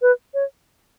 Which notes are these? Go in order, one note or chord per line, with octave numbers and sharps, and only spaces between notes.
B4
C#5